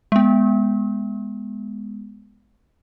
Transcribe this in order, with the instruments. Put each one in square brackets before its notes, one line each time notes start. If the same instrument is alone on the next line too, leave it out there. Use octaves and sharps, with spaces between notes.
[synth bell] G#3 B3